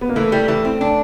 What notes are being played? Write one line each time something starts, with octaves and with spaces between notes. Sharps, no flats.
B3
A#3
E3 A3
G3
E3
C4
D4